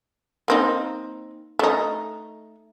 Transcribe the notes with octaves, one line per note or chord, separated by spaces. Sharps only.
A#3 C4 D#4
A3 D#4